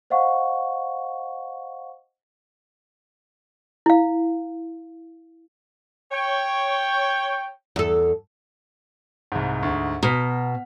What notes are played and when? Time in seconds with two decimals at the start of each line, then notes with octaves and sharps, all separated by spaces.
0.10 C5 D#5 F5 F#5 C#6
3.86 E4 F5
6.11 C#5 G5
7.76 E2 A4
9.32 C2 G#2
9.63 D2 G#2
10.03 B2 A#5 F6 B6